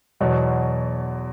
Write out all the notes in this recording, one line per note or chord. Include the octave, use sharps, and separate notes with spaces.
E2 B2 F#3